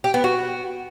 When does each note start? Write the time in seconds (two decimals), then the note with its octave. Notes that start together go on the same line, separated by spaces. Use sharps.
0.04 G4
0.14 B3
0.24 F#4